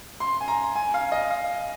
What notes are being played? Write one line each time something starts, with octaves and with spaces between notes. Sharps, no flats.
C6
G#5
A#5
G#5
F5
D#5
F5